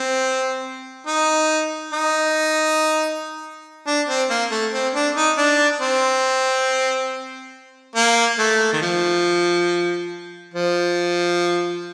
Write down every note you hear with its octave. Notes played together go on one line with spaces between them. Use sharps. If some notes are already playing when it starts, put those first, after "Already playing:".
Already playing: C4
D#4
D#4
D4
C4
A#3
A3
C4
D4
D#4
D4
C4
A#3
A3
D#3
F3
F3